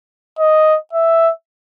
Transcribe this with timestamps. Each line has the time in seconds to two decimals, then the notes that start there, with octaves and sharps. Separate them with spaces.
0.39 D#5
0.93 E5